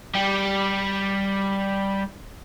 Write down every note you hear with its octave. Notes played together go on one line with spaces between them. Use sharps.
G3 G4